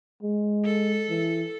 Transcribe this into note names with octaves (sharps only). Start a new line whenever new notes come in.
G#3
A4
E3